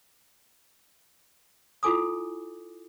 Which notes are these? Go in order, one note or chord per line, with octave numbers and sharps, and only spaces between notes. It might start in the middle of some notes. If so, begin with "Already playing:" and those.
E4 F4 A4 G#5 D6 D#6